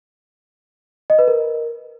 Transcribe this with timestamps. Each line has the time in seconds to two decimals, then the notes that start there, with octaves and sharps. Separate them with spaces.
1.10 D#5
1.19 B4
1.28 A#4